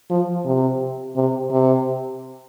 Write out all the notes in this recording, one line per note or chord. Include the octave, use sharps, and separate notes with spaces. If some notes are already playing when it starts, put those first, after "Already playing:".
F3
C3
C3
C3